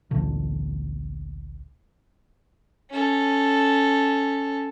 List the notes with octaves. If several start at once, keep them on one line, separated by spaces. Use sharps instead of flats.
A1 D2 A#2 D3
C#4 A4